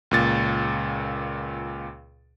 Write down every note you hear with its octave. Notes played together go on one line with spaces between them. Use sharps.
C#2 A#2 A6